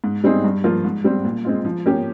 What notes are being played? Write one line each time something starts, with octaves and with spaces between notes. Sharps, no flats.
G#2
G3 C4 D#4 G#4
G2
F3 A#3 F4
G#2
G3 C4
A#2
G#3 C4 F4
F3
A#3 C#4 G4